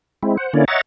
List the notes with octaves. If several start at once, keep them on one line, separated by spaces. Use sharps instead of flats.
G#3 C4 E4
C5 F#5
D3 A#3 C#4 E4 C#5 D5
C#5 D#5 E5 F#5 A#5 A6